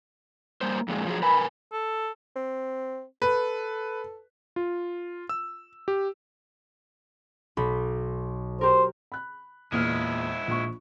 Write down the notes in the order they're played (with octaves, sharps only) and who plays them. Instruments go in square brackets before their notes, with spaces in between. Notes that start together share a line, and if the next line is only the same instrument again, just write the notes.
[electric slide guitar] G3 A#3 C5
F2 A#2 G#3
F3 F#3 G#4
[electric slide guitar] A#4 B4 G#5 [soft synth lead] B5
[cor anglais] A4
[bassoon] C4
[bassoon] A4 [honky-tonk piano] B4
[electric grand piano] F4
E6
G4
[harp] B1 B5
[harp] G4 A#4 [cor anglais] C5
[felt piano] B5 F#6
[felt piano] E2 A#2 F6 [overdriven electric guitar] G#3 E4
[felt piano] A#1 C#6